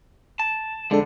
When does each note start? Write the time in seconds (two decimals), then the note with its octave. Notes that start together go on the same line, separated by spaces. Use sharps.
0.39 A5
0.91 F2 D3 G#3 D4 A4